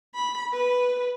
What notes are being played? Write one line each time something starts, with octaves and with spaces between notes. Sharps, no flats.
B5
B4